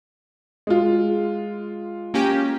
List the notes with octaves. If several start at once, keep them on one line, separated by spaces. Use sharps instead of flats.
G#3 F4
A#3 C#4 G4